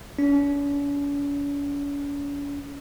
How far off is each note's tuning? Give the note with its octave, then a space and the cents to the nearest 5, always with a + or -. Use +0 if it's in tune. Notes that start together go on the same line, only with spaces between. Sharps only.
C#4 +45